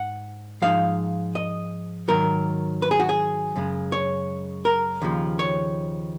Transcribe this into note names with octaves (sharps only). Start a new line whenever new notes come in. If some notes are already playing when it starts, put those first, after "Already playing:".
Already playing: G#2 F#5
G#2 F3 G#3 D#4 F5
D#5
G#2 D#3 F#3 A#4
B4
G#4
F#4
G#4
F#2 C#3 G#3
C#5
A#4
D#2 C#3 F3
C#5